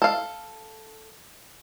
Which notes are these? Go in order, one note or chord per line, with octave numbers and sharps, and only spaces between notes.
A4 F5